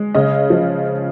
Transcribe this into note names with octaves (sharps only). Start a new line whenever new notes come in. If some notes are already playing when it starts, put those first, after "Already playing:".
Already playing: G#3
C#3 D#5
F3